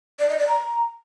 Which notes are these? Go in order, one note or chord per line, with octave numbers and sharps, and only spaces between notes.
D5
D#5
D5
A#5